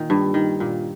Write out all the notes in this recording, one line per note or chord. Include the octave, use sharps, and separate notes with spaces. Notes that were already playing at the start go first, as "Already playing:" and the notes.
Already playing: A#2 D#3
G2
D#3
A#2